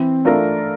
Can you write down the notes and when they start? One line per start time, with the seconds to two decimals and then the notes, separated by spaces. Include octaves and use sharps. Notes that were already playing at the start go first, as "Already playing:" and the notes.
Already playing: E3 C4
0.25 A3 D4 F4 A#4